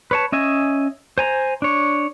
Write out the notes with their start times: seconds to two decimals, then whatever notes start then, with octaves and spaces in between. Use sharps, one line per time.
0.11 B4 C#5 A5
0.32 C#4 D#5 E5 G#5
1.18 C5 G#5 A#5
1.62 D4 C#5